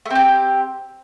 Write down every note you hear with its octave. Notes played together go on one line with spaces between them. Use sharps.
A3 C4 G4